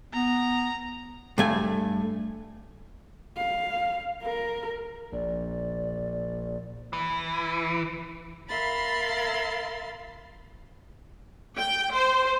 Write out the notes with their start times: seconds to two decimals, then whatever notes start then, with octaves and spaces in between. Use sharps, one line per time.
0.13 B3 A#5
1.38 G2 A3 G#5
3.37 F5
4.23 A#4
5.12 A#1 D5
6.93 E3
8.48 A#4 E5 F5 B5 C6 A6
11.58 G5
11.93 C5